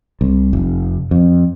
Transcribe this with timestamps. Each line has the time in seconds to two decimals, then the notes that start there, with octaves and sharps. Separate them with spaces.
0.21 C2
0.53 F1
1.11 F2